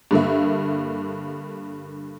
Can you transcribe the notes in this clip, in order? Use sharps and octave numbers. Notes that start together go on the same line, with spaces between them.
G2 D3 A#3 E5